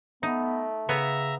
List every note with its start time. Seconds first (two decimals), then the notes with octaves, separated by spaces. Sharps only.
0.23 A3 B3 D#4
0.89 C#3 B3 C#5 E5 A#5